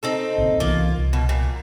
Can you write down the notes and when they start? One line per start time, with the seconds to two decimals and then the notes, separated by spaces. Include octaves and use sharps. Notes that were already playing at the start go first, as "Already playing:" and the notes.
0.03 C4 D#4 A4
0.38 A#1 A#2 C#3
0.60 C2 E3 A#3 B3 F4
0.98 C2
1.13 B2
1.29 A#2